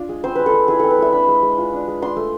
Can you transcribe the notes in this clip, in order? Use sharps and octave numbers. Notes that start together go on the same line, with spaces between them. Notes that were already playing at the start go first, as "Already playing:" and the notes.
Already playing: D4 F4
G#3
C4 C5
G#3 B4
A4
G#3
E4 G#4
C4 A4
B4
G#3 E5
D4 B5
G#3
G#3
F4
D4
G#3
D4 C6
A3